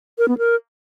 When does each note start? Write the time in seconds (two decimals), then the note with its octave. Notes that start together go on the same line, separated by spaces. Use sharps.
0.18 A#4
0.28 B3
0.38 A#4